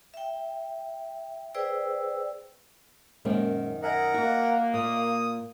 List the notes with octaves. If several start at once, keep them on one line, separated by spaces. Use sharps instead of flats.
E5 G5
G#4 B4 C5 D5 G5 E6
F#2 A#2 D#3 G#3 C4 C#4
A#4 D#5 E5 F#5 G#5
A#3 F#4
A#2 D#6